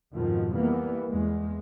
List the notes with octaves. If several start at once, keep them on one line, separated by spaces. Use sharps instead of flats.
F2 G#2 B2 D#3 F3
E3 G3 A#3 B3
E2 G#3